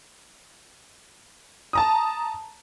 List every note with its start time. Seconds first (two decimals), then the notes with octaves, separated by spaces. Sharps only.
1.73 A5 A#5 D#6